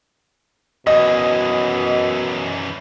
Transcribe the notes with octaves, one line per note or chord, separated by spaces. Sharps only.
F#2 B2 E3 D#5